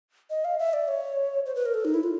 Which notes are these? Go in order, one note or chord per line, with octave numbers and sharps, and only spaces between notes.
D#5
F5
E5
D5
C#5
C5
B4
A#4
A4
D#4
E4
F4